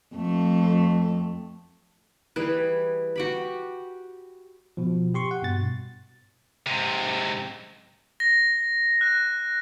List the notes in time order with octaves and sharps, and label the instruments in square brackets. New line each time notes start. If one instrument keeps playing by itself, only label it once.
[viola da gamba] F2 A3
[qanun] E3 G3 G#4 B4
F#4 G4 B5
[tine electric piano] B2 F3
G4 C6 C#6
F#5
G2 B2 A6
[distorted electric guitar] G#2 C3
[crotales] A#6
F#6